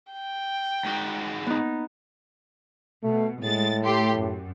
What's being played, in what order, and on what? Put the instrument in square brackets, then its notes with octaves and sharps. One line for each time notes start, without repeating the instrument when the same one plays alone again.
[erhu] G5
[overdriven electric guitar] G#2 F#4
[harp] B3 D#4
[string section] B2 [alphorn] A3
[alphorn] A2 [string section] G#3 A6
[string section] A3 G4 C6
F#2